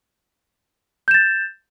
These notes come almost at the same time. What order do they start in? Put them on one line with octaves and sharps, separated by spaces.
G6 E7 A6